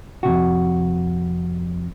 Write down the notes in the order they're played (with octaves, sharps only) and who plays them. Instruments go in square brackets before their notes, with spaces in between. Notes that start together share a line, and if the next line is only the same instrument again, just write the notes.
[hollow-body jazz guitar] F2 G#2 C3 F#4